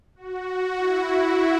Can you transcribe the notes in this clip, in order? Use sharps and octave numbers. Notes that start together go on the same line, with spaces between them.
F#4
E4